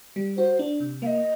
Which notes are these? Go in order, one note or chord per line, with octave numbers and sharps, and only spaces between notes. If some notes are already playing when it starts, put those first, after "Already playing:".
G3
F#4 C5
D4
C3
A#3 D#5 F5